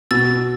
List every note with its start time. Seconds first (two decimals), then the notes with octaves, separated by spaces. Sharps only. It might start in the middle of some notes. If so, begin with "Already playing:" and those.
0.11 B2 E6 A6